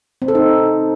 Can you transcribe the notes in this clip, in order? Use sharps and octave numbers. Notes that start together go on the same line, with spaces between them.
C4
A4
D#4